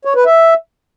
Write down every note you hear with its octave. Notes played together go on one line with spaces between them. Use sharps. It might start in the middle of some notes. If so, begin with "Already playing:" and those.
C#5
B4
E5